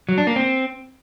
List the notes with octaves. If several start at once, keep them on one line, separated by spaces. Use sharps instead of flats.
F#3
D4
A#3
C4